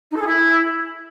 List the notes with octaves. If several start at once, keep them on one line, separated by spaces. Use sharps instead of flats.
D#4
A4
G#4
E4